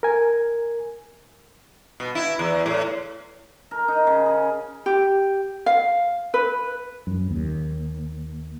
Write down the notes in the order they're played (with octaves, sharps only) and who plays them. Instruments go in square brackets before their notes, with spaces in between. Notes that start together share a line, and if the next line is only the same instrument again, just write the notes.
[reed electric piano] A#4 G#5
[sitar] B2
E4
E2
A2
[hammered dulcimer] A#4
D#4
C#3
G#4
[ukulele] G4
F5
B4
[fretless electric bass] F#2
D#2